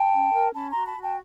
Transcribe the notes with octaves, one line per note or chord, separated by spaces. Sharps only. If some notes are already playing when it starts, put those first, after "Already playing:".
Already playing: G5 A5
C#4
A#4
C#4 A5 B5
A#5 C6
F#4
A5 B5
F#4
G5 A5